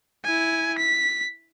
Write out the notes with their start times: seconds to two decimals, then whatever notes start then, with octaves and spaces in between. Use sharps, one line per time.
0.24 E4 G#5
0.78 B6